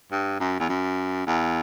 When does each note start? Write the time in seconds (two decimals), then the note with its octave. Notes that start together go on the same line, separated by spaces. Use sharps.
0.12 G2
0.40 F#2
0.60 E2
0.69 F#2
1.26 E2